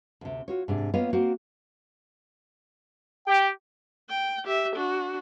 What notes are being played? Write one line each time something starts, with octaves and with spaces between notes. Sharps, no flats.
D2 C3
F4 F#4 C#5
G#2 C3 D4
A#3 B3 F4 C#5 D#5 F5
A#3 C4 F#4 C5
G4 G5
G5
G4 E5
D4 F#4